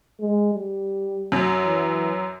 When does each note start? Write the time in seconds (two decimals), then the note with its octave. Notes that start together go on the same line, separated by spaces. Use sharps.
0.21 G#3
0.54 G3
1.32 F#2 F#3
1.66 E3